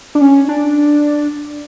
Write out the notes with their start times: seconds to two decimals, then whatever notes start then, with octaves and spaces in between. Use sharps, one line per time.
0.15 D4
0.21 C#4
0.49 D4